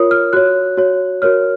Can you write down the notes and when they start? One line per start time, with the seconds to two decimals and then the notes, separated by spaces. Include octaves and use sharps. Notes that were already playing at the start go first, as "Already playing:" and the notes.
Already playing: F4 A#4 C#5 D#6
0.11 F6
0.33 F#4 C#5 F#6
0.77 F#4 C#5
1.22 F#4 A#4 C#5 F6